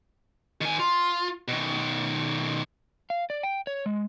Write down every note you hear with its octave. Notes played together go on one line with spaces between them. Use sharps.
D#3 G#5
F4
B2 D#3
F5
D5
G5
C#5
G#3